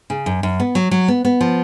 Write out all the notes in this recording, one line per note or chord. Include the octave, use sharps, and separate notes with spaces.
C#3
F#2
F#2
B3
F#3
F#3
B3
B3
F3